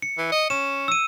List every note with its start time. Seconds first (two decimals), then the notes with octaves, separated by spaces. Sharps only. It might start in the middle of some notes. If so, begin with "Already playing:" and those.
0.02 C#7
0.18 E3
0.32 D#5
0.50 C#4 E7
0.88 E6 D#7